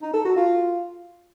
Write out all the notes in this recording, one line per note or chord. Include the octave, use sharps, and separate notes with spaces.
D#4
A4
F#4
F4